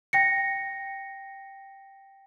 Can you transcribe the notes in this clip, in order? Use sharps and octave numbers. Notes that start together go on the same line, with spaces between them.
G5 A#6 C#7